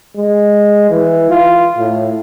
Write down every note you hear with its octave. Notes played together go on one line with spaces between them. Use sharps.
G#3
E3
F4
A2